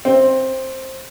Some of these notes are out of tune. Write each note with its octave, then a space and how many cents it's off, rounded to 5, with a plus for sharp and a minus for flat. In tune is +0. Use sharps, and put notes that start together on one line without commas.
C4 +10